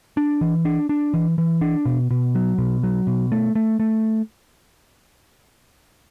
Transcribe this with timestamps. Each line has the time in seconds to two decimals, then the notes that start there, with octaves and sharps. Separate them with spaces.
0.17 D4
0.41 E3
0.65 D4
0.89 D4
1.14 E3
1.38 E3
1.61 D4
1.86 B2
2.11 B2
2.35 F#3
2.58 B2
2.83 F#3
3.07 B2
3.32 A3
3.55 A3
3.80 A3